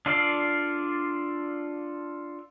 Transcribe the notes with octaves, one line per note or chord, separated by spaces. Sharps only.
D4 F4 A4 D5 F5